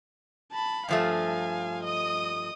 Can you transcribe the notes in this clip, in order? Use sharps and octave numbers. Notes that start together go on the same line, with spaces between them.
A5 B5
G2 F3 A3 F5 G#5
D#5 D#6